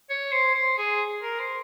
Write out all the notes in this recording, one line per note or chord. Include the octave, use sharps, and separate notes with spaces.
C#5
C5
C5
G#4
A#4
C5